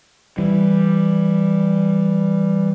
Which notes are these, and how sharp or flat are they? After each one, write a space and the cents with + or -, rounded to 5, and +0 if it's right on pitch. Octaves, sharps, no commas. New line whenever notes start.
E3 +0 G3 +0